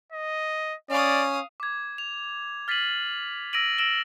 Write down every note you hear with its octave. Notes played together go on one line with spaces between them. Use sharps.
D#5
C#4 D5 F5 D#6
D6 G#6
F7
F6 A6 B6 C7 D#7 F#7
E6 A#6 D7 D#7 F#7
E6 A#6 D7 E7 F#7 G7